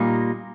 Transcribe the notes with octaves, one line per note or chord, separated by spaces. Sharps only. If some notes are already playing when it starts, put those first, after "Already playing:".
Already playing: A#2 G3 A#3 D#4